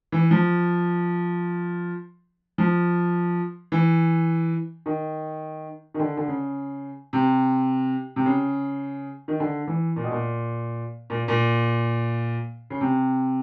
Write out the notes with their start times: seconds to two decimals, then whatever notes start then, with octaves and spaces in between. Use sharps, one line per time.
0.12 E3
0.31 F3
2.58 F3
3.72 E3
4.86 D#3
5.94 D#3
6.00 D3
6.17 D3
6.28 C#3
7.13 C3
8.16 C3
8.26 C#3
9.28 D#3
9.40 D3
9.67 E3
9.96 A#2
10.04 B2
10.11 A#2
11.10 A#2
11.28 A#2
12.70 C#3
12.81 C3